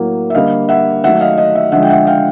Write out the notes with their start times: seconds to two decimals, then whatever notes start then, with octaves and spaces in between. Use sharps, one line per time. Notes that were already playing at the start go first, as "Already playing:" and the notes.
Already playing: A2 F#3 A#3
0.30 E5
0.35 D3 G3 A#3 D#5 F5
0.69 E5 F#5
1.04 D#3 F#3 A3 E5 F#5
1.21 D#5 F5
1.38 D#5
1.55 E5
1.72 D3 F3 G#3 E5 F#5
1.83 G5
1.90 E5 F#5
2.07 F5 G5